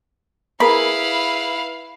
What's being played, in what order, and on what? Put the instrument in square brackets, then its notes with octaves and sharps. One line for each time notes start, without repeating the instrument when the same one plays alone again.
[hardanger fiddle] E4 B4 [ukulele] G#4 A#4 [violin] F5 [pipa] B5